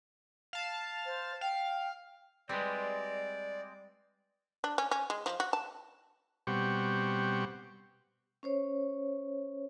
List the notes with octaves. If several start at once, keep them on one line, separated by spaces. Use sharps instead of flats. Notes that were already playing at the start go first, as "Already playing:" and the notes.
F5 A5
C5
F5 G5
G3 G#3 C4 B4 D5
D4
C#4
C#4
G#3
F3
F#4
A5
B2 G3 C4 G4 F#5 C#6
C#4 C5 C#5